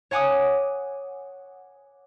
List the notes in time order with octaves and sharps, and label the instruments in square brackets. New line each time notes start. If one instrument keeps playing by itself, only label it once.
[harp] C#5 F#5 G#5 D6 D#6